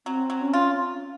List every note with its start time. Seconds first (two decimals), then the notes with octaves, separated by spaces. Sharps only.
0.06 F#3 C4
0.30 F#3
0.41 C#4
0.53 F4